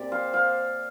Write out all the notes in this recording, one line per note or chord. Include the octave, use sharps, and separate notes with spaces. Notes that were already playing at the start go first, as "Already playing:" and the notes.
Already playing: A#2 C4 G4 D5
C5 F5
C5 F5